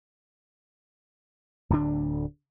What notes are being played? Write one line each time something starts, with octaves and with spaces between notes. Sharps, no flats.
D1 D2 D3 D4